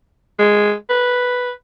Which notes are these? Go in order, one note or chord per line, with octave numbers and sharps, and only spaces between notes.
G#3
B4